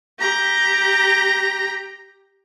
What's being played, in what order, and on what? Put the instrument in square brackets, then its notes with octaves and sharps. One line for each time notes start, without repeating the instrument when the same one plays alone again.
[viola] G4 A#5